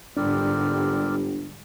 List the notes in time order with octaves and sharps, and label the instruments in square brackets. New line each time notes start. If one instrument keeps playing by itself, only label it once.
[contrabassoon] G1 [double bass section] G#2 D3 G3 [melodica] C4 A#4 D5 [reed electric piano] D4